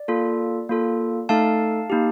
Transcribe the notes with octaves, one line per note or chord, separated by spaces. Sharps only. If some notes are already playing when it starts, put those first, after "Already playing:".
Already playing: D5
A#3 F4 A4
A#3 F4 A4
A3 D#4 A4 F5 A5
A#3 D#4 G4